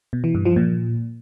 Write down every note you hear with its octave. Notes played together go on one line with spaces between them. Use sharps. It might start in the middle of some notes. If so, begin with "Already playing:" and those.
B2
E3
G2
F3
A#2